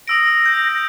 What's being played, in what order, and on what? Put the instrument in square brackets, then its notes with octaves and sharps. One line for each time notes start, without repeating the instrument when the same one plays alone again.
[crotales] D#6 E6 D7 [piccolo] A#6
[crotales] G6